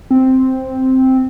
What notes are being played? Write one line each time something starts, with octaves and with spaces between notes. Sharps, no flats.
C4